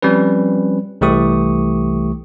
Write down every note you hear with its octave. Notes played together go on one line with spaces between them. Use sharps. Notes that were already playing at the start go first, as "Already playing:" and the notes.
F3 G3 C4 C#4 B4
C2 E3 A3 G4 C#6 D#6